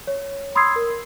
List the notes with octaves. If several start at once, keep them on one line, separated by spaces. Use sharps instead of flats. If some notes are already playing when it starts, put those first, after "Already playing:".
C#5
B5 C6 D#6 E6 G#6 C7
A#4